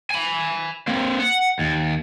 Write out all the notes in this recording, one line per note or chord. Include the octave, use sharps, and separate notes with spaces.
G#5 B5
A#3 C4
F#5
D#2